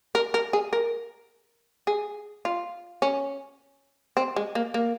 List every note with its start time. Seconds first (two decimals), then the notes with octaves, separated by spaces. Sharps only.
0.15 A#4
0.34 A#4
0.53 G#4
0.73 A#4
1.87 G#4
2.45 F4
3.02 C#4
4.17 C4
4.36 G#3
4.55 A#3
4.74 A#3